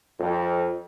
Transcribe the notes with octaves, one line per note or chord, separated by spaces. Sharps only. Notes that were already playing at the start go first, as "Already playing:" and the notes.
F2